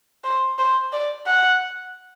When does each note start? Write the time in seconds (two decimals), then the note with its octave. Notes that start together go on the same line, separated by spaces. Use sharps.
0.24 C5
0.58 C5
0.93 D5
1.26 F#5